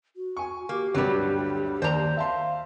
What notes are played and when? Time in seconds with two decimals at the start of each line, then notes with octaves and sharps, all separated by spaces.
0.16 F#4
0.37 G#5 C#6
0.69 A#3 G4
0.94 D2 G2 D3 F#3 G3
1.82 D#2 C5 D5 A#5
2.17 E5 F5 A5 C6